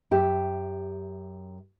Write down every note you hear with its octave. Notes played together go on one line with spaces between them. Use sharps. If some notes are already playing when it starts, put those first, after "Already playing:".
F#2 G4 E5